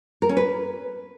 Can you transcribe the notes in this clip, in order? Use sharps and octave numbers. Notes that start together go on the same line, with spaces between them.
A#4
C#4
B4